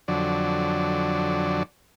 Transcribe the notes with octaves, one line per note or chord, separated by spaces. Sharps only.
F2 D3 F#3 D5